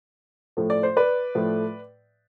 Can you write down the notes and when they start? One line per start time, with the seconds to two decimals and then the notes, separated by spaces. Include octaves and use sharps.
0.57 A2 F3 A3
0.70 D5
0.83 C5
0.97 B4 D5
1.35 A2 F3 A3